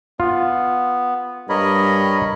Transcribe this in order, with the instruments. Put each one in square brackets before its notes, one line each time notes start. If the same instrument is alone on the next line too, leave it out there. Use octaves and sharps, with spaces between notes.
[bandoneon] B3 [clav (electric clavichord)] F4
[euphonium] G2 [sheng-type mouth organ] A#4 D#5 [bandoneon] C#5 B5